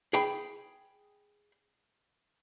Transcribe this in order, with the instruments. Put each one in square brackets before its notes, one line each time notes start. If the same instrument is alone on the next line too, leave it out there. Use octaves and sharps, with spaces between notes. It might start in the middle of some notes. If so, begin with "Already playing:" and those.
[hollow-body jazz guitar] G#4 G5 B5